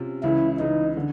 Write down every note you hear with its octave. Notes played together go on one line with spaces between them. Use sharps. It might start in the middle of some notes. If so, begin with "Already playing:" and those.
Already playing: C3 C#4 F4
C#2 C#3 E3 E4
C#2 C#3 E3 D#4
D3